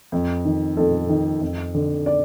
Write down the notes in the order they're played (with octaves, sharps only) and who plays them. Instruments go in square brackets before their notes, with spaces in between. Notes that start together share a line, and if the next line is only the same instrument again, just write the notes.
[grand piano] F2
D#3
F2 A4
D#3
F2
D3
D5